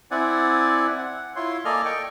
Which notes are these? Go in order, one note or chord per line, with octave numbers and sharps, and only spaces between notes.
C4 E4 D5 F#5 G#5
F#5
E4 F4 C#5 C6
A#3 A4 D5 D#5 G#5 F6
G5 C#6